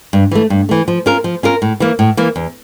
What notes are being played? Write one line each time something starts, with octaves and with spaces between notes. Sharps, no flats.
G2
E3 A3
G2
E3 A3
F3
C#4 F4 A#4
F3
C#4 F4 A#4
A2
E3 A#3
A2
E3 A#3
E2